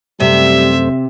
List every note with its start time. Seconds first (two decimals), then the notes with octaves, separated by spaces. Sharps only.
0.20 F#2 C3 G3 A3 C5 E5